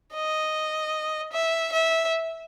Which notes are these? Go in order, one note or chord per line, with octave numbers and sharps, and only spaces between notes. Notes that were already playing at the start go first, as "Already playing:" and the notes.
D#5
E5
E5